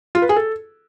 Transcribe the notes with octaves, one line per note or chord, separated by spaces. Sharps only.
F4
B4
G#4
A4